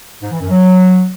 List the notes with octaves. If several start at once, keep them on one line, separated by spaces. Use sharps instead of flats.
G#2
E3
F#2
F#3